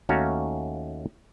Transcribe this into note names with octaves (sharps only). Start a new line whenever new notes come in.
D#2 A3 C#4 F#4 F5 A#5